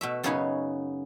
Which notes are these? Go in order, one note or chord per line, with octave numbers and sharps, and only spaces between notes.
B2 A3 E5
F#2 C#3 B3 D#4 C#5 G#5